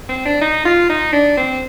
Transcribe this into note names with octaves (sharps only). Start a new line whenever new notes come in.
C4
D4
D#4
F4
D#4
D4
C4